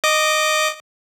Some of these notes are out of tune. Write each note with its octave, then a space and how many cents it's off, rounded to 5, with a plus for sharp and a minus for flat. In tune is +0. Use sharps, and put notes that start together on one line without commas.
D#5 -10 D6 +0